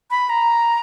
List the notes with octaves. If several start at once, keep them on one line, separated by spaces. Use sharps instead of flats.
B5
A#5